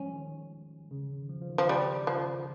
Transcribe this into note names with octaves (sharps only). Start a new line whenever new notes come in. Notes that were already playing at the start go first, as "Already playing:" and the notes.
Already playing: F3 G3 G#3 C#4
D#3
C#3
D#3
F3
F3
D#3
F3
C#3 G3
C#3 F3